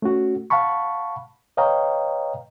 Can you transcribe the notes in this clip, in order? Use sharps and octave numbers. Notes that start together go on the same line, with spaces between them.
A3 C#4 F#4
F5 F#5 A5 B5 C#6
B4 C#5 D#5 F5 G5 A#5